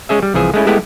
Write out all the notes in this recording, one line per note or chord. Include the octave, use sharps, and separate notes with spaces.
G#3 C#4 G#4 E5
G3
C2 E3 F3 G#4 E5
G#3 A3 C#4 E4
G#3 A3 B3 E4 G4 A4